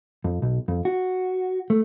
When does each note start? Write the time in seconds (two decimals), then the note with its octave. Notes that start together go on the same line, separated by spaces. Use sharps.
0.24 F2
0.42 B1
0.68 F2
0.85 F#4
1.70 A3